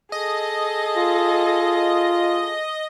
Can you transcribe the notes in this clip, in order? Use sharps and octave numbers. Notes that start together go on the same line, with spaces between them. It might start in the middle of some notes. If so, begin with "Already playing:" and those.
G#4 A4 D#5
F4